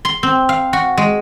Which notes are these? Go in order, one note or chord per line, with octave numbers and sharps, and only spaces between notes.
C6
C4
F5
F#4
G#3